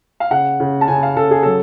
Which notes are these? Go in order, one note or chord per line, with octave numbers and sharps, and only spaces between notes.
F5
C#3 F#5
C#3
A5
C#3 G#5
F5
C#3 A4
G#4
F#3 A4